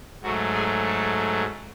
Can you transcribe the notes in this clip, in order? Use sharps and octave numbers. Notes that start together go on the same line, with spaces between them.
G#2 F#3 A3 F#4
G#4
A4